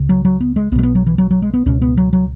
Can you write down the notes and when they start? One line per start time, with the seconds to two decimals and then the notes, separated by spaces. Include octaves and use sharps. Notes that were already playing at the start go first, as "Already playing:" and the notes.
Already playing: C#2 C#3
0.09 F#3
0.25 F#3
0.40 B3
0.56 G#3
0.72 B1 B3
0.75 B2 G#3
0.83 B3
0.95 F#3
1.06 E3
1.18 F#3
1.31 F#3
1.42 G#3
1.54 B3
1.66 C#2 B2 C#4
1.82 B3
1.97 F#3
2.13 F#3